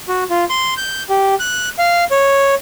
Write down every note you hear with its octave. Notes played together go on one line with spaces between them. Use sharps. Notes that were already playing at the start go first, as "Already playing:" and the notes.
F#4
F4
C6
G6
G4
F#6
F5
C#5